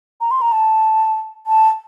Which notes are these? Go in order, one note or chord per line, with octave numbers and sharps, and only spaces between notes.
A#5
C6
A#5
A5
A5